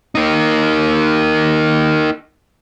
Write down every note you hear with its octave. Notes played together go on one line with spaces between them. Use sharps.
A#3 D#4